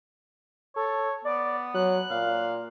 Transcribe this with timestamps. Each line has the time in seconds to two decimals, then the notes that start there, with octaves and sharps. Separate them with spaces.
0.76 A4 C#5
1.25 B3 D5
1.74 F#3 F#6
2.11 A#2 F5